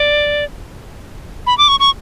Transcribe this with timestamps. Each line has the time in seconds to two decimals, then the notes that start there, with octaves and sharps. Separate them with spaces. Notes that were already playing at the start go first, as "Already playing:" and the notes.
Already playing: D5
1.47 B5
1.58 D6
1.68 C#6
1.80 C#6